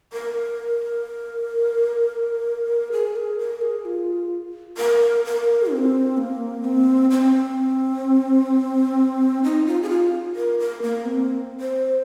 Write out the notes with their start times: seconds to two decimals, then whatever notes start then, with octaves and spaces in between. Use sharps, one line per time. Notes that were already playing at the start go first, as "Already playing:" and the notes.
0.13 A#4
2.92 G#4
3.16 A#4
3.39 A#4
3.62 G#4
3.85 F4
4.78 A#4
5.25 A#4
5.71 C4
6.17 A#3
6.64 C4
7.11 C4
9.44 D#4
9.66 F4
9.83 G#4
9.89 F4
10.36 A#4
10.59 A#4
10.82 A#3
11.05 C4
11.61 C5